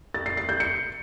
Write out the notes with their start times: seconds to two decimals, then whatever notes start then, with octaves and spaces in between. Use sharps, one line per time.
0.14 A6
0.26 C7
0.37 C7
0.49 G6
0.60 C#7